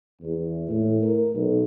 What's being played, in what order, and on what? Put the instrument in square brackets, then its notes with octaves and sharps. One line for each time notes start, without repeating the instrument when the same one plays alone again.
[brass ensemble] E2
A2
A#4
B1